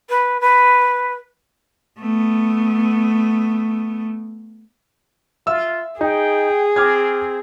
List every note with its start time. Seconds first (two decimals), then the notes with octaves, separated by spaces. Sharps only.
0.09 B4
0.41 B4
1.99 A3 B3
5.47 F4 E5 E6
6.01 D#4 G#4 G5
6.76 C4 D6 F6 G#6